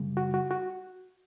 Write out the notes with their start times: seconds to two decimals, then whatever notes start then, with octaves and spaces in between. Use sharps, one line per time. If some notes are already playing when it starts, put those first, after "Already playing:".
Already playing: F#2 C#3 G3
0.17 F#4
0.34 F#4
0.51 F#4